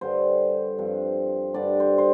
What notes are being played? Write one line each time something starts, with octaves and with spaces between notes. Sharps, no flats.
G2 D3 G3 C5
G2 F3 C4
G2 D3 G3 D4 D5
C5
C5